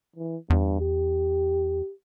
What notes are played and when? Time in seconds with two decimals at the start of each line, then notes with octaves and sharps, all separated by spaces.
0.16 E3
0.50 E2 G2
0.80 G4